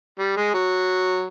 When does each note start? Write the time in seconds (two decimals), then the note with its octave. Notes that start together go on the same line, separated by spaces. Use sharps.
0.19 G3
0.37 G#3
0.54 F#3